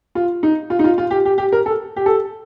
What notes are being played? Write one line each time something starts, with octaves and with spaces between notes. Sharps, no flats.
F4
D#4
F4
D#4
F4
F4
G4
G4
G4
A#4
A4
G4
A4